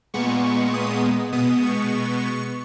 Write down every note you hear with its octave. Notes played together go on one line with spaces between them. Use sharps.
A#2 G#3 B3 C#6
C#6
D#6
B2 G#3 B3 D#6
C#6